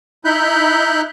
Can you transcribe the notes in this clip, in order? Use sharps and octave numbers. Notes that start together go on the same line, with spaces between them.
D#4 E4 B5 F#6 G6